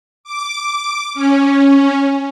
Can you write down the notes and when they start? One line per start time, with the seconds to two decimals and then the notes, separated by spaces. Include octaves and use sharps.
0.24 D6
1.14 C#4